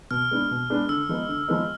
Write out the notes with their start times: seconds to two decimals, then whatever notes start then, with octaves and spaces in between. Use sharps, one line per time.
0.11 B2 F6
0.31 G#3 B3 D4
0.51 B2
0.70 G#3 B3 D4
0.89 D3 E6
1.09 F3 G#3 B3 D#4
1.28 D3
1.48 F3 G#3 B3 D#4